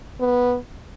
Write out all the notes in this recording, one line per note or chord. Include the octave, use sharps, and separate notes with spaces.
B3